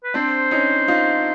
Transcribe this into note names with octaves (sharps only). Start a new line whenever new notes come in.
B4
C4 D4 C5
C#4 D#4
D#4 F4